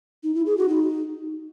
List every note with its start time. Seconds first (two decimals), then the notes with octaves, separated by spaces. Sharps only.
0.23 D#4
0.35 E4
0.46 G#4
0.57 F#4
0.69 D#4